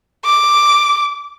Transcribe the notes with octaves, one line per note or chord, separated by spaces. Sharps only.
D6